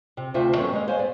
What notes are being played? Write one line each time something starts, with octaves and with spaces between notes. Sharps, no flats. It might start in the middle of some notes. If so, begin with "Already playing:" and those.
C3
D2 C3 F4 C5 E5
D#3 F#3 B3 C#4 A4 C#5
G3 G#3 A#3 D#5
C5 C#5 F5 G#5
B3 D5